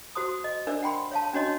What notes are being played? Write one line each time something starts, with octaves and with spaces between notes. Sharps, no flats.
F#4 C5 C6 D#6
D#5
D4 A#4 C5 D5 E5
F#5 G5 B5 C6
C#5 F5 A5
C#4 D4 F#4 C#5 D#5 C6